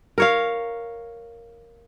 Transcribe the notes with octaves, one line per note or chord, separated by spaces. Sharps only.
A#4 C#5 F5